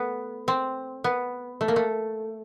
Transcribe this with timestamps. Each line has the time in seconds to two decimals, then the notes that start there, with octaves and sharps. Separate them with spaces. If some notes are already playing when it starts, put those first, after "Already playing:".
Already playing: A3 B3
0.48 C4
1.04 B3
1.61 A3
1.68 A#3
1.76 A3